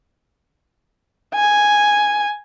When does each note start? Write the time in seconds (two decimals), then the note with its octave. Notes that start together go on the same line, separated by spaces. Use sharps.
1.34 G#5